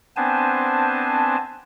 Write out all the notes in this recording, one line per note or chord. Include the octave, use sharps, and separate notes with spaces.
B3 C4 D4 C5 G#5 A5